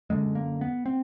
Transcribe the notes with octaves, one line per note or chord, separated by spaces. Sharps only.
F#2 D3 G#3
A#3
B3
C4